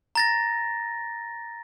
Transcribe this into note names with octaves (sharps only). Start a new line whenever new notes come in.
A#5 A6 A#6